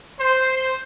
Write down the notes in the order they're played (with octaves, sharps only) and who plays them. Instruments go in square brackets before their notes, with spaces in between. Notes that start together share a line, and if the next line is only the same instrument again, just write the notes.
[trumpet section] C5